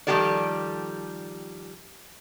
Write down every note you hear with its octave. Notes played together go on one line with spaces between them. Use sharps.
D#3 F3 G3 G4 A4 D5